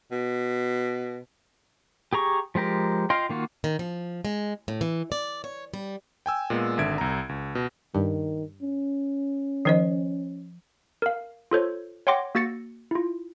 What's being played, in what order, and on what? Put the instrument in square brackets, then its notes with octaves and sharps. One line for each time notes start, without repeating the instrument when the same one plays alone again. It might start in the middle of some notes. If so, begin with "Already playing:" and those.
[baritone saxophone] B2
[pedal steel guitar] G4 G#4 A#5 C#6
F3 G#3 G4 A#4
F4 D#5 F5 G5 C6
D#3 A#3 F4 F#4
[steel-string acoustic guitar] D#3
F3
G#3
A2
E3
D5
C#5
G3
[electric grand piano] G5 G#5 E6
A#2 G#3 B3
G#1 D3 E5 G#6 D7
C2 A#5
C#2
B2
[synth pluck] G2 [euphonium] D#3
[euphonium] C#4
[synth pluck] D#3 [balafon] F3 C5 D#5
[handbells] A#4 F5
F4 A4 C5 C#5
C#5 F#5 G5 C6 D6 A#6
A#3 F#4 E6 A6 A#6 C#7
E4 F4